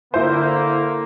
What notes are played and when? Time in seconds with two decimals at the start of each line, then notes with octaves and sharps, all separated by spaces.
0.14 D3 A#3 E4 C5